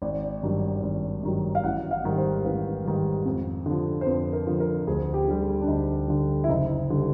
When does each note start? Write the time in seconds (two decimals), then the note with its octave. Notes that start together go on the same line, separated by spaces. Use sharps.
0.02 G#1 D5
0.43 G2 D#3 F#3
0.83 G#1
1.23 G2 D#3 F#3
1.55 F5
1.64 A1 F#5
1.91 F5
2.04 G#2 D#3 G3
2.17 C5
2.45 A1 B4
2.85 G#2 D#3 G3
3.25 F2
3.66 D3 F3
4.01 C5
4.06 F2 B4
4.33 A#4
4.47 D3 F3
4.60 A#4
4.87 D2 G#4
5.14 G4
5.28 D3 G3
5.41 G#4
5.62 D4
5.68 D2 D#4
6.08 D3 G3
6.44 E4
6.49 F#1 D#4
6.90 D3 G3